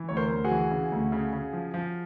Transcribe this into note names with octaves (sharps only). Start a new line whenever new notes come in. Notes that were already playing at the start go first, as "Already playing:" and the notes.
Already playing: E3
D2 C#5
A#4 C5
D2
F#4 G#4
E3
C#3
D2
C#3
C#3
F3
F3